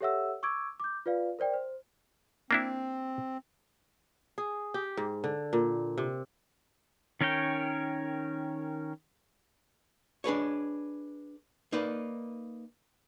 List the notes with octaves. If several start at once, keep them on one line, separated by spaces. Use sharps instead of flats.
G4 A4 C#5 E5 F#5 E6
C#6 D6 E6 G#6 D7
D6 G6
F4 B4 D5 F5
A#4 C5 D5 G5
C5
A#3 C4 D4 E4
G#4
G4
G#2
D3
A#2
C3
D#3 C#4 A#4 C#5 G5
D4 G#4 B4 C#5
A#3 D#4 B4 D5